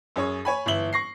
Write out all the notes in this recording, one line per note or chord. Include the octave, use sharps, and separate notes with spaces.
F#2 G#4 C#5
C#5 G#5 B5
G1 E3 E5 F#7 G7
C#6 A#6 C7